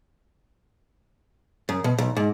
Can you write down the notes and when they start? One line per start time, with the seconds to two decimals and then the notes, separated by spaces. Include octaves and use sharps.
1.69 F#2
1.84 B2
1.98 B1
2.17 G#2